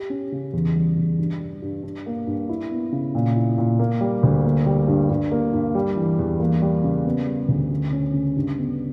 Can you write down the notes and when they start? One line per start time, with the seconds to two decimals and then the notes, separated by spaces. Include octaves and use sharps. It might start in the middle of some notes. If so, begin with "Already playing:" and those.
Already playing: G4
0.10 C#4
0.32 C#3
0.53 E2
0.76 G3
0.97 E2
1.19 G2
1.40 G3
1.62 G2
1.83 D4
2.06 A#3
2.27 G2
2.49 E4
2.71 B3
2.92 C#3
3.15 A#2
3.36 E4
3.58 A#2
3.79 A#3
4.01 G3
4.23 D2
4.44 A#3
4.66 G3
4.88 G2
5.10 G2
5.31 A#3
5.53 G2
5.75 G3
5.96 E3
6.19 E2
6.40 A#3
6.62 G3
6.84 C#3
7.05 B3
7.27 G3
7.48 D2
7.71 C#3
7.92 C#4
8.13 C#3
8.36 G2
8.58 B3